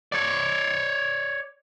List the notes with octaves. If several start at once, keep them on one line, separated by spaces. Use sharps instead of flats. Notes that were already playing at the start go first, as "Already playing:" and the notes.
C#5 D5